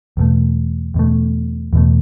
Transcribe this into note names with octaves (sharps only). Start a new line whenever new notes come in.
E2 B2 A3
E2 B2 A3
E2 B2 A3